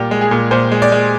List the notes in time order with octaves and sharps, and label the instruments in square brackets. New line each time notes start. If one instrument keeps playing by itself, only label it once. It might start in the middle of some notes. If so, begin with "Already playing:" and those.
Already playing: [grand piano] A#2 G3 G4
G#3
G#4
A#2
A#2 C5
G#3
D5
G#3